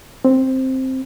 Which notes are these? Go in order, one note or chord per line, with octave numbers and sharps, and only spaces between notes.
C4